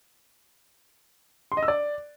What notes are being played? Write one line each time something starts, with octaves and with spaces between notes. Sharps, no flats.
C6
D#5
E6
D5